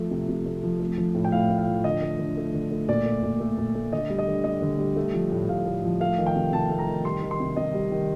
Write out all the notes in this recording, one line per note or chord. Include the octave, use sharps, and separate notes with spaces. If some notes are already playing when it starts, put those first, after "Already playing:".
Already playing: F3 A3
C3
C3
A3
F3
A3
F3
A2
G5
A2 F5
A3
F5
F3
D3 D#5
A3
D3
A3
D3
A3
A#2 D5
A3
A#2
A3
A#2
A3
D3 D#5
G3
D#5
D3
G3 D#5
D3
G3
A3
F3
A2
A2 F5
A3
F3
A3 F5
D#3
G5
C3
C3 A5
A3
A#5
D#3
G3 C6
D#3
C6
C3
C3 D#5
G3
D#3